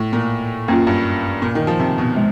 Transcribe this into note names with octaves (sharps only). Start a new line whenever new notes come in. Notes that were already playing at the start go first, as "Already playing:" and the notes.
Already playing: A2
A#2
F#2 A#3 C#4 F4
G2
A#2
D#3
F3
C3
B2
G#3